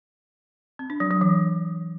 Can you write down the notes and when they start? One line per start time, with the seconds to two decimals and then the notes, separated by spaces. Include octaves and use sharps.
0.79 C4
0.90 D4
1.00 F#3
1.11 F#3
1.21 E3